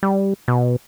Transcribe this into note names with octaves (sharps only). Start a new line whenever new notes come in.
G3
B2